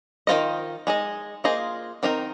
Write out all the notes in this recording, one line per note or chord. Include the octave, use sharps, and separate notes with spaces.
D#3 A#3 F4 C5 D#5
G#3 D#4 G#4 D#5
A#3 F4 G#4 C5 D#5
D#3 C4 D#4 A#4